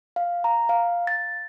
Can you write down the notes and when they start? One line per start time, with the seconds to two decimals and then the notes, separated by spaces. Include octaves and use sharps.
0.16 F5
0.44 A#5
0.69 F5
1.07 A6